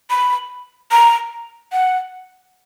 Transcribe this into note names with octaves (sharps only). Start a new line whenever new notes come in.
B5
A#5
F#5